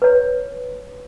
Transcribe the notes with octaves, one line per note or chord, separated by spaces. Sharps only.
B4 C#5